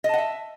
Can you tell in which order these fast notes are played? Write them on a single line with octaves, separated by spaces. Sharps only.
D#5 A5 F#5 E5